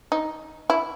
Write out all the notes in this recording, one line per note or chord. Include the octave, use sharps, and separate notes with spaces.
D#4
E4